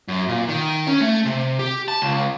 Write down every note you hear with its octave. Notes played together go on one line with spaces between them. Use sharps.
F#2
A#2
D#3
C#4
A3
C3
G4
A5
C#2